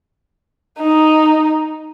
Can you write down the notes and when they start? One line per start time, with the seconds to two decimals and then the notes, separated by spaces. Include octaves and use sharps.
0.79 D#4